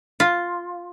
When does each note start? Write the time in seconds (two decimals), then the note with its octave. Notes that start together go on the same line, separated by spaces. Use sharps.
0.20 F4